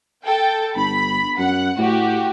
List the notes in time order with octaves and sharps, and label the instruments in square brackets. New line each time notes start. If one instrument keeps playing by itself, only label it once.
[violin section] A4 G5
[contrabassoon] G1 [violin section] B5
[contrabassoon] F#2 [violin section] F#5
[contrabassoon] A2 [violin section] F#4 G4